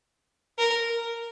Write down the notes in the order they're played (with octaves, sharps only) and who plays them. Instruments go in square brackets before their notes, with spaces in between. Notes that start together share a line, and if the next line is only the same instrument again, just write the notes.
[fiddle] A#4